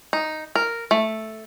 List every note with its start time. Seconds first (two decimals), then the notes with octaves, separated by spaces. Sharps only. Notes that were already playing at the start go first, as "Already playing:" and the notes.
0.13 D#4
0.55 A#4
0.91 A3